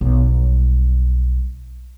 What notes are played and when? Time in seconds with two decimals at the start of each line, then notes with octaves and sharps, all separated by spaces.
0.01 B1 G3